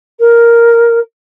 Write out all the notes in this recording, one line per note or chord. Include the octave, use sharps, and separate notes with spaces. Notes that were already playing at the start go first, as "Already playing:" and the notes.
A#4